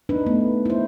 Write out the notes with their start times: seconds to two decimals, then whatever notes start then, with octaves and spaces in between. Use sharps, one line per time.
0.09 D4 D#4 B4
0.26 A3 B3
0.65 E4 C5